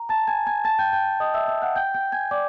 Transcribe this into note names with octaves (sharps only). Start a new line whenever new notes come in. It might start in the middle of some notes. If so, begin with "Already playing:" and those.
Already playing: A#5
A5 A6
G#5 G#6
G#5 G#6
A5 A6
G5 G6
G5 G6
D#5 D#6
E5 E6
E5 E6
F#5 F#6
G5 G6
G5 G6
G#5 G#6
D5 D6